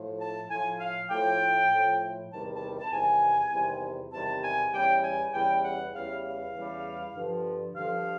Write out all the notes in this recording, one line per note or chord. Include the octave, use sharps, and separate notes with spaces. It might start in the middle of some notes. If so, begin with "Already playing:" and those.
Already playing: A2 F3
A5
A2 F3 G#5
F5
A2 F3 G5
A2 F3
E2 C3 D#3 G3 A5
A5
A5
E2 C3 D#3 G3 G#5
E2 C3 D#3 G3
E2 C3 D#3 G3 A5
G#5
E2 C#3 E3 G3 G5
G#5
E2 C#3 E3 G3 G5
F#5
E2 C#3 E3 G3 F5
F5
E2 C#3 E3 G3
G2 D3 F3
G2 D3 F3 F5